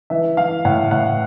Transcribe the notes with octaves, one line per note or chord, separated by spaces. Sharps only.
E3 E5
E3 F5
A2 F#5
A2 F#5